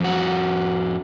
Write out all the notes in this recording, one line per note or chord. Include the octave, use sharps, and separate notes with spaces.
F2 F#4